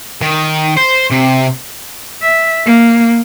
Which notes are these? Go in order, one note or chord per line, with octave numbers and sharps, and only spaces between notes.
D#3
C5
C3
E5
A#3